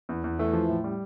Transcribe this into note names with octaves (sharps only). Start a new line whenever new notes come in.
E2
E2
E3 A3
F3
A2
G3